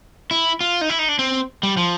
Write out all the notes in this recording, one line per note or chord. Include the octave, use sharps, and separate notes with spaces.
E4
F4
D#4
E4
D#4
D4
C4
G3
F3